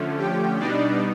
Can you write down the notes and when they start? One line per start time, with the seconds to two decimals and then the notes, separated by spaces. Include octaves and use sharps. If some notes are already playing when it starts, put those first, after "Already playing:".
Already playing: D3 F3 A3 C#4
0.18 G4 G5
0.59 B2 G3 B3 D4 D#4 D5